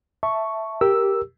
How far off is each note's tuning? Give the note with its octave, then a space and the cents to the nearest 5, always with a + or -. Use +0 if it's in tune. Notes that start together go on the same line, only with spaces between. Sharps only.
E5 +0 A5 +0 C#6 +0
G4 +0 A#4 +0 E6 +0